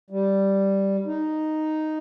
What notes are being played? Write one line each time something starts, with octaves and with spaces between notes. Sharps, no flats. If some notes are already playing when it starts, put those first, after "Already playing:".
G3
D#4